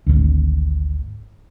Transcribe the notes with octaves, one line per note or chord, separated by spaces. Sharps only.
G#1 D2